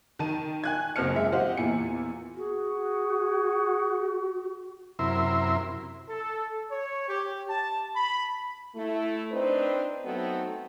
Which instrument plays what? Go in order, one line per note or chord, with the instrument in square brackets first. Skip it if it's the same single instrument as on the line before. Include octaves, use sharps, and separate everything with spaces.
[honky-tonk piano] D#3 A5 D#7
G#5 F#6 G#6
F#1 C4 A5 F6 C#7
G#3 E5
G4 C5 D#5 F5 F#5
E2 A#2 E4 G#5 C#7
[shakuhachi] F#4 [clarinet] G#4
[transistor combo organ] F#2 C3 E4 A#4 E5 C6
[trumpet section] A4
C#5
G4
A5
B5
[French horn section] A3 E4
C4 D4 D#4 B4 C5
F#3 A3 B3 C4 D#4 F#4